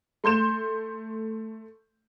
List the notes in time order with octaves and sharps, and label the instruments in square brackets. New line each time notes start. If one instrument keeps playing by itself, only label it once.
[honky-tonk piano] A3 C6 G6 E7